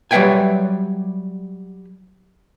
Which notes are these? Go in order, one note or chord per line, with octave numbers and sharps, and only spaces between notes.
F#3 G3 B4 E5 G5 G#5